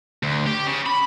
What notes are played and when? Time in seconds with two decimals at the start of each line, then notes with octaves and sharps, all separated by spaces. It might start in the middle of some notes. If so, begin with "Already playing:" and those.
0.23 D2
0.46 G4
0.66 C#3
0.86 B5